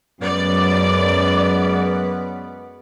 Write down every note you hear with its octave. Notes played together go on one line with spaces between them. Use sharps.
F#2 G#3 B3 C#4 D5